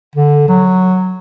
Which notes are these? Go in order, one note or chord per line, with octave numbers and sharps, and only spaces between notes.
D3
F#3